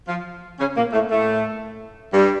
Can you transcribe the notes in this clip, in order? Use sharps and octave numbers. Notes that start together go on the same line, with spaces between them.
F3 F4
C#3 C#4
A#2 A#3
A2 A3
A2 A3
G2 G3